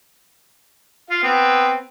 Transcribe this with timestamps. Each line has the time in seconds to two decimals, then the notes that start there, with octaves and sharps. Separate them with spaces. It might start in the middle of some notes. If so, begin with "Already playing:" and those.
1.10 F4 F5
1.23 B3 C4